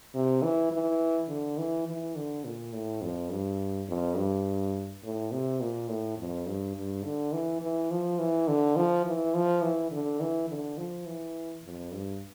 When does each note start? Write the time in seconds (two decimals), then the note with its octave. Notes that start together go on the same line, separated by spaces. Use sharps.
0.15 C3
0.43 E3
0.72 E3
1.29 D3
1.58 E3
1.87 E3
2.16 D3
2.45 A#2
2.73 A2
3.02 F2
3.31 G2
3.88 F2
4.17 G2
5.03 A2
5.32 C3
5.61 A#2
5.89 A2
6.18 F2
6.47 G2
6.76 G2
7.04 D3
7.33 E3
7.62 E3
7.91 F3
8.19 E3
8.48 D3
8.76 F3
9.06 E3
9.34 F3
9.62 E3
9.91 D3
10.20 E3
10.49 D3
10.78 F3
11.06 E3
11.64 F2
11.93 G2